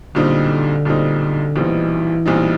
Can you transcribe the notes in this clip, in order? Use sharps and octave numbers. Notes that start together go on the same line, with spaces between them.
B1 A#2 D3 G3 C4 D#4
B1 A#2 G3 C4 D#4
B1 A#2 E3 G3 C4 D#4
B1 A#2 G3 C4 D#4